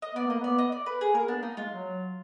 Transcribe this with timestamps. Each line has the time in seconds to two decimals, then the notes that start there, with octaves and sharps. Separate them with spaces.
0.02 D#5
0.15 B3 D5
0.27 A#3 D#5
0.40 B3 D5
0.58 D#5
0.72 D5
0.86 B4
1.01 G#4
1.14 A#3 A#4
1.28 B3 D4
1.42 A#3 D#4
1.57 G#3 F4
1.71 F#3